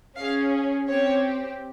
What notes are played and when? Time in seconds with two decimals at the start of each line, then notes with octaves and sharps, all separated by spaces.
0.16 C#4 G#4 F5
0.87 C4 G4 C#5